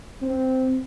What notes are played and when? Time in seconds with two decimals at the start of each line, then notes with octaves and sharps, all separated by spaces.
0.22 C4